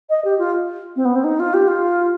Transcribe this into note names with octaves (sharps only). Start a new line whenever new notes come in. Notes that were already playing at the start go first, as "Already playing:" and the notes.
D#5
G4
F4
C4
B3
C4
D#4
F4
G4
F4